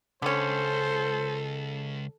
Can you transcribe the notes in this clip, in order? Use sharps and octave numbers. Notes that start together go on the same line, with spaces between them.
C#2 D3 C#4 A4 C5